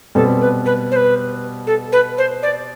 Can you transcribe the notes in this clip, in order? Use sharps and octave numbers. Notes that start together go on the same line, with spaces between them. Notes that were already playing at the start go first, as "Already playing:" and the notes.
B2 G3 C4 A4
B4
B4
C5
B4
A4
B4
C5
D5